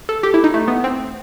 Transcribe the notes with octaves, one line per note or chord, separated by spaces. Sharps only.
A4
G4
E4
D#4
A3
B3
C4